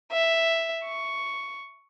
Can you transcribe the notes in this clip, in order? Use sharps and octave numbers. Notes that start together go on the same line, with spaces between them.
E5
C#6